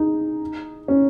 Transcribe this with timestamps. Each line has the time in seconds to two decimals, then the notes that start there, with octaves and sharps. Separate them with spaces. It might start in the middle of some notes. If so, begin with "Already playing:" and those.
Already playing: D#4 G#4
0.88 C#4